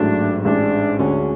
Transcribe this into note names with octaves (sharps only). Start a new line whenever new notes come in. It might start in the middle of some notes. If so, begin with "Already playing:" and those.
Already playing: A1 G#2 F#3 A3 D4
A1 G#2 G#3 D4
D2 D3 G#3 C#4